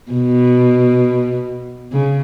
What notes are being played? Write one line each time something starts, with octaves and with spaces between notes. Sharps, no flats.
B2
C#3